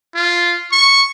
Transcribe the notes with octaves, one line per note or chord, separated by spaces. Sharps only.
F4
C#6